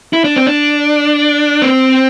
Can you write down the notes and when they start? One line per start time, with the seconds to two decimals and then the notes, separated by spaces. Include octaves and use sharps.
0.13 E4
0.24 D4
0.36 C4
0.46 D4
1.62 C4